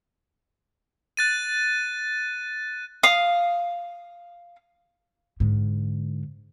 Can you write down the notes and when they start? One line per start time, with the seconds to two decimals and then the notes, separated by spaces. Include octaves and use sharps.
1.17 F#6 A6 D#7
3.03 F5 D#6
5.40 G#2 D3